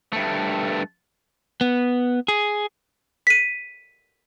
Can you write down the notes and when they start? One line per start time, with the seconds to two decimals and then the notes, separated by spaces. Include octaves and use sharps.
0.13 G2 A3
1.61 B3
2.28 G#4
3.27 B6 D#7